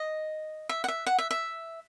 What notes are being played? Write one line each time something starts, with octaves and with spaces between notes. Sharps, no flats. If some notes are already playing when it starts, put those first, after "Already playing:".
Already playing: D#5
E5
F#5
E5
F#5
E5
E5